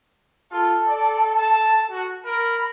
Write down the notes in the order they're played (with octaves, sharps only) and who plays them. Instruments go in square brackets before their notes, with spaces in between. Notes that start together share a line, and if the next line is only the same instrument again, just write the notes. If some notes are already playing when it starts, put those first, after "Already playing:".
[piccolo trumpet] F4 [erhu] A4
[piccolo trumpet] D5
A5
F#4
[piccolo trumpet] A#4 [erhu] B5